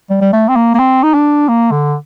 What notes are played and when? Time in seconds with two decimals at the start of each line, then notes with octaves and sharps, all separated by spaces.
0.10 G3
0.21 G3
0.33 A3
0.49 C4
0.56 A#3
0.74 A#3
0.79 C4
1.03 D#4
1.14 D4
1.48 A#3
1.71 D3